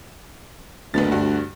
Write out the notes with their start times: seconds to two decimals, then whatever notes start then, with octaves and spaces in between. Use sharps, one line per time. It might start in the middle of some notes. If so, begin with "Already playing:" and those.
0.94 F#1 D2 B3 A6
1.12 G2 F#4